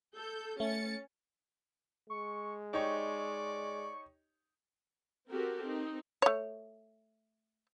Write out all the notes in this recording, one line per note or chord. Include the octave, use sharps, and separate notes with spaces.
A4 G6
A3 C#4 A6 C#7
G#3 C#6
D#4 G4 C#5 D5 C#6
C4 F#4 G4 A4 A#4
C4 D#4
A3 C#5